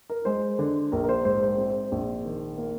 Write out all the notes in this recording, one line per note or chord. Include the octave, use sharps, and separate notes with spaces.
A#4
G#3 C5
D3
A#1 A#4
A#4
C5
G#2 C5
C5
C4
A#1
D#3
A#3